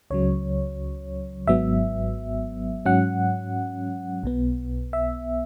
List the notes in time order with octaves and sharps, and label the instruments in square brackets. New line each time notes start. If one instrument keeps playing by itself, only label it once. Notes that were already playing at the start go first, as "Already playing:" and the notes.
[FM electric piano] C#2 C#3 F#3 C#5
G#1 G#2 F#3 B3 E5
G#2 F#3 C#4 F#5
B1 B2 B3
E5